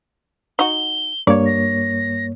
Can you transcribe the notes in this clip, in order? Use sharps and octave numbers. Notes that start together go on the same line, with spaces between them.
D#4 F#4 G7
G2 A#3 C#5 D5
A#6